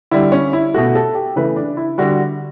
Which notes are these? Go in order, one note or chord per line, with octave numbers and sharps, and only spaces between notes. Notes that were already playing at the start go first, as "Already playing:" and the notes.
D3 G3 E4
C#4
E4
B2 A3 F#4
A4
G4
C#3 E3 A3 B4
D4
E4
D3 G3 F#4